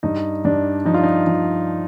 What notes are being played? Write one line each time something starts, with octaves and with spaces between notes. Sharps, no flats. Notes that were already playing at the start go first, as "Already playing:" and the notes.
G2 D#4
G2 D4
F3 D#4
F4
D#4
F3